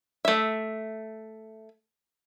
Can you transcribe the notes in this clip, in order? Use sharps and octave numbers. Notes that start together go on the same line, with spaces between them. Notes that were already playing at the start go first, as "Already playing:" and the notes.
A3 E5